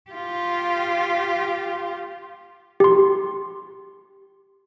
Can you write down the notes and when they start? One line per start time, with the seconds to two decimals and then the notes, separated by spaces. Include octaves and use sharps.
0.11 F4 G4
2.80 G4 C6